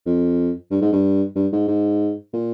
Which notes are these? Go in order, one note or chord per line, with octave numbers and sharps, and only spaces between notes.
F2
G2
G#2
G2
G2
G#2
G#2
A#2